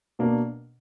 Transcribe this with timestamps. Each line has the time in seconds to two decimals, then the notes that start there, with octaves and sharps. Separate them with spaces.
0.19 B2 A#3 D4